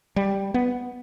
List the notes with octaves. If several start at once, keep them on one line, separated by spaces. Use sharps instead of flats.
G3
B3